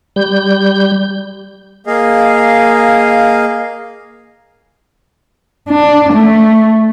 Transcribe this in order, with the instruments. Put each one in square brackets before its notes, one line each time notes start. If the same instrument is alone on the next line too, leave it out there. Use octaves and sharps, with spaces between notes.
[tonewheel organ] G3 G6
[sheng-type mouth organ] A#3 G#4 D#5 F5
[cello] D4
A3